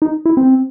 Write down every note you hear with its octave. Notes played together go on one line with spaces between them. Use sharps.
D#4
E4
C4